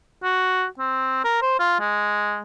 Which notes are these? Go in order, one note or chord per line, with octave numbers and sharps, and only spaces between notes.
F#4
C4
A#4
C5
F4
G#3